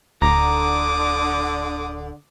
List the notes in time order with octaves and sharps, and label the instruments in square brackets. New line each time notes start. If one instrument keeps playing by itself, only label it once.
[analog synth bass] D1 [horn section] D3 [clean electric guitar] A#5 [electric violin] D6 D#6